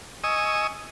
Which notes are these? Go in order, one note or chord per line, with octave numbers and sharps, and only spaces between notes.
D#5 G#5 C#6 D#6 E6